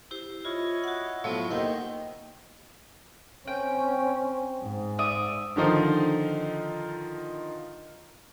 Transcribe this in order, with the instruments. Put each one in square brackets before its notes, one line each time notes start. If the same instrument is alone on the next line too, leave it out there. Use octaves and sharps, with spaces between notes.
[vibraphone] E4 G4 C5
[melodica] E4 C#5 D#5 [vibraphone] F4
[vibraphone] F#4 F#5
[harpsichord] A2 F3 F#3 [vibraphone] A3 B3 C#6
[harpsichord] D#2 D#3 [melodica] D#4 C5 D#5 [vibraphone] A#4 F#5 G5
[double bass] C4 C#4 [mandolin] G5
[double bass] G#2
[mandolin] D5 E5 D#6
[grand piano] D3 D#3 F3 D#4 F4